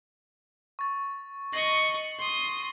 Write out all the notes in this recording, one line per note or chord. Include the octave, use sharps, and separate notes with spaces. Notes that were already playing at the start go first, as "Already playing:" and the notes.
C#6 A6
D#5 C#6 A#6 C7 F#7
C6 D#6